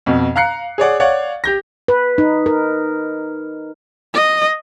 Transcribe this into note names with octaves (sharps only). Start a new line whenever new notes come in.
F2 B2
F5 A#5 F#6 C7 C#7
G#4 C#5 D5 F#5
C#5 D5 F5 F#5
G4 G6 A#6
B4
D#4
A#4
D#5